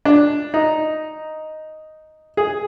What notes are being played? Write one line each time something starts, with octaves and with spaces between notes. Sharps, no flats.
D4
D#4
G#4